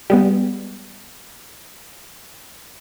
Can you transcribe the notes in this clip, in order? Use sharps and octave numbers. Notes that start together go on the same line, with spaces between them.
G3 G#3 B3